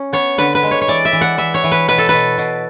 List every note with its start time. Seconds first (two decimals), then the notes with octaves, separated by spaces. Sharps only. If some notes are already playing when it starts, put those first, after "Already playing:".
Already playing: C#4
0.13 B3 C#5
0.38 D3 B4
0.55 B4
0.63 G#3
0.71 C#5
0.81 C#5
0.88 E3 D5
1.05 E5
1.13 E3
1.21 F#5
1.38 E3 E5
1.54 C#5
1.64 E3
1.72 B4
1.88 B2 B4
1.98 A4
2.09 B2 B4
2.38 B2